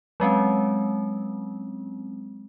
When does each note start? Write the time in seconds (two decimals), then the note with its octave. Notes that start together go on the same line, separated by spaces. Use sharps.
0.20 F#3 G#3 C4 C#4